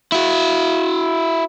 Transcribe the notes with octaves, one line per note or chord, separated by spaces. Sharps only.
E4 F#4